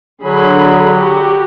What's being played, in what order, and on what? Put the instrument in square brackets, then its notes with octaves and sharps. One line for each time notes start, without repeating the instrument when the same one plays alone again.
[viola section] D3 G#4 B5 [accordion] F#3
[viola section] F#4 G4